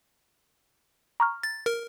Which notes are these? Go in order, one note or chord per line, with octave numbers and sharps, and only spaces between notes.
A#5 C#6 F6
A6
A#4